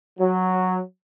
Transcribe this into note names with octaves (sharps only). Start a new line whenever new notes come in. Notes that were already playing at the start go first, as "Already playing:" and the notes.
F#3